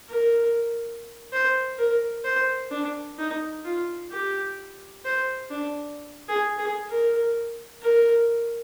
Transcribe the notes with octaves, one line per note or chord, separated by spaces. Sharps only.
A#4
C5
A#4
C5
D4
D#4
F4
G4
C5
D4
G#4
G#4
A#4
A#4